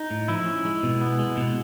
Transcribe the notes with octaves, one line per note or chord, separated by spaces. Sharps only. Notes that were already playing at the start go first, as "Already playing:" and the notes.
Already playing: D#4
A2
F3 E4
C#4
G#3
B2
B3
G#3
B2